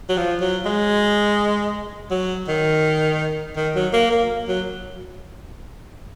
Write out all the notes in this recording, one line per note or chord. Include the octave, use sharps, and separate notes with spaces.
F#3
F3
F#3
G#3
F#3
D#3
D#3
F#3
A#3
A#3
F#3